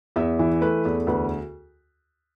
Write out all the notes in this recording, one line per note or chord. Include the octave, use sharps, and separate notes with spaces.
E2 E5
E3
A3 B4
E2
D2 B4